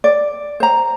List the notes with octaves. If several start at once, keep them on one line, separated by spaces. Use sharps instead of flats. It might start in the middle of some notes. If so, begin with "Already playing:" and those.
D5
C5 A#5